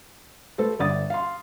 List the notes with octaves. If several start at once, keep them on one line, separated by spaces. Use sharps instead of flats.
A3 A4 B4 C5
G1 D5 D#6 A6
F5 C6